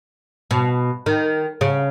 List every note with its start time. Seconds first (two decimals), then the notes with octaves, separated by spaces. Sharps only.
0.51 B2
1.06 D#3
1.61 C#3